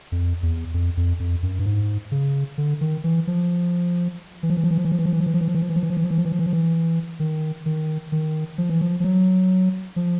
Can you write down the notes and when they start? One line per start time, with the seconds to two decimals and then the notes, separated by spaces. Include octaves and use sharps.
0.12 F2
0.43 E2
0.74 F2
0.97 F2
1.20 F2
1.43 F#2
1.59 G2
1.66 G#2
2.12 C#3
2.58 D3
2.81 D#3
3.04 E3
3.27 F3
4.43 E3
4.50 F3
4.57 E3
4.64 F3
4.71 E3
4.78 F3
4.85 E3
4.92 F3
4.99 E3
5.06 F3
5.13 E3
5.20 F3
5.26 E3
5.34 F3
5.41 E3
5.48 F3
5.55 E3
5.62 F3
5.69 E3
5.76 F3
5.83 E3
5.90 F3
5.97 E3
6.04 F3
6.11 E3
6.18 F3
6.25 E3
6.32 F3
6.39 E3
6.46 F3
6.53 E3
7.20 D#3
7.66 D#3
8.12 D#3
8.58 F3
8.70 E3
8.81 F3
9.00 F3
9.04 F#3
9.96 F3